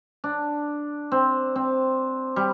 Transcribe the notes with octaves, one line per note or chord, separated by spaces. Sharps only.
D4
C4
C4
G3